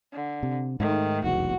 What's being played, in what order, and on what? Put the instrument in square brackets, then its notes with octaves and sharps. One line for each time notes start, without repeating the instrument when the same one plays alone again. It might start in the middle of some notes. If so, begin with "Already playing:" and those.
[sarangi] D3
[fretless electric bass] C3
[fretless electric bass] G#2 A3 [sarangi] D#3
[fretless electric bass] F1 B1 E2 [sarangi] F#4